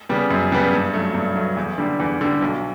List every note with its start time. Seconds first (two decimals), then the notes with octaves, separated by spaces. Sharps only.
0.09 C#3 G3 B3
0.31 F#2
0.52 C#3 G3 B3
0.73 G2
0.94 F#3 A3
1.14 G2
1.36 F#3 A3
1.57 E2
1.78 D3 G3
2.00 E2
2.21 D3 G3
2.42 B1